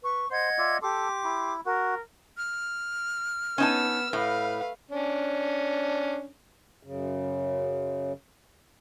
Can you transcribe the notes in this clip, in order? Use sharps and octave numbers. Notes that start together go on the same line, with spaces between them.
B4 C#6
C5 D#5 F#5 G#6
F4 D5 E5
G4 A4 C6 D6
E4
F#4 A#4
F6
B3 C#4 D#4 A5 E6
A2 B4 F5
C#4 D4
F#2 C#3